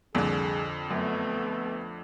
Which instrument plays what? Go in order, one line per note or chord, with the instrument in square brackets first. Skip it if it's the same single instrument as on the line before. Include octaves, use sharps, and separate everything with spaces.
[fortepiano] C2 A#2 [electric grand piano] F2 D3 [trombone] G#4
[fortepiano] F#2 [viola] A3 [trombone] B3